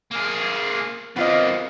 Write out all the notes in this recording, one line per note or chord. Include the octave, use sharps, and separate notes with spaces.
A#3 G#4
F2 A#3 B3 F4 D#5